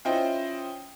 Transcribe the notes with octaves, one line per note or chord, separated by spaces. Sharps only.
C#4 E4 F4 C5 D#5 G5